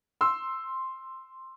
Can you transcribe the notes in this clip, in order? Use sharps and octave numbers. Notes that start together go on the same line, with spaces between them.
C6 E6